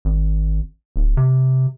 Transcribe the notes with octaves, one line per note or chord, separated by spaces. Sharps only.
G#1
D1
C3